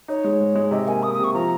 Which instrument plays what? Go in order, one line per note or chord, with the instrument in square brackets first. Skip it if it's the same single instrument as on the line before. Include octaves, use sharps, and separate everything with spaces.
[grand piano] D#4 [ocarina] C#5
[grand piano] G#3
G#2
G#3
[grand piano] C3 [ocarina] D#5
[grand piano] A#3 [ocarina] G#5
[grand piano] A#3 [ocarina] D#6
[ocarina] D#6
[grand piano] C3 [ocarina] C#6
[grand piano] F3 [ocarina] A#5